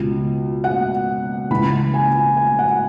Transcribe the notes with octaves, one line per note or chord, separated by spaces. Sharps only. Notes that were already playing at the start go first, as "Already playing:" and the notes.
Already playing: C#2 B2
F#5
C#2 C#3 E3 B5
G#5
G#5
F#5